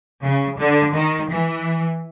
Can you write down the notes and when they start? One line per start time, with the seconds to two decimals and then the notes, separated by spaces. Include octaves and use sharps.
0.21 C#3
0.58 D3
0.94 D#3
1.30 E3